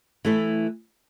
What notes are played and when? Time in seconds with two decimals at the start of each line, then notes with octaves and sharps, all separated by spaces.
0.25 E3 A3 E4